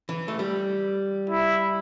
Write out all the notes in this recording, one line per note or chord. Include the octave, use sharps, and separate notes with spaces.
E3
A3
G3
E4